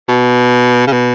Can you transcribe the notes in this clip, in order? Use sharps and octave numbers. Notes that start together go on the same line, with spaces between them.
B2
C#3
B2